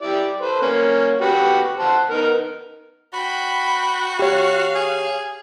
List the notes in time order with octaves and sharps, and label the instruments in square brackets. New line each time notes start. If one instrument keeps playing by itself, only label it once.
[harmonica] E4 G4 D5
A4 B4 C5
A#3 C#4
F#4 G4 B4
C5 F#5 A5
B3 D#4 A#4
[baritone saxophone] F#4 [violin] G5 B5
[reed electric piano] G4 C#5 [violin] F5
[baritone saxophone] G#4